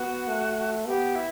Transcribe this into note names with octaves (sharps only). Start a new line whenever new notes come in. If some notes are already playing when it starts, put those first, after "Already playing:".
Already playing: B3 F#4
A3
B3 G4
E4